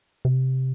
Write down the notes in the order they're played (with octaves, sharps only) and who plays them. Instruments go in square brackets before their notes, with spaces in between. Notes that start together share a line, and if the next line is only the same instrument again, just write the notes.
[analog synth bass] C3